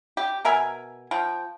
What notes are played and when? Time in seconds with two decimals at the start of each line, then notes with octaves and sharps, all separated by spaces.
0.17 G4
0.45 B2 A#4 E5 G#5
1.11 F3 G5